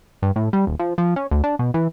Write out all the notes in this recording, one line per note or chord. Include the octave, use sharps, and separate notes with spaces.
G2
A2
G3
D#1
F3
F3
C#4
D2
D4
B2
E3